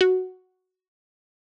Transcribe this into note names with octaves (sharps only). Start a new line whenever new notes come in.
F#4